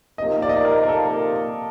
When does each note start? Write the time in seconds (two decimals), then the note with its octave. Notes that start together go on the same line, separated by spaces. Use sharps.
0.18 C3 F3 A#3 D#4 D#5
0.42 D5
0.49 D#5
0.56 D5
0.65 A#4
0.83 A#4
0.89 A4